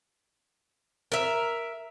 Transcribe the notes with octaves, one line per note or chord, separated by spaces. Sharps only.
A#4 E5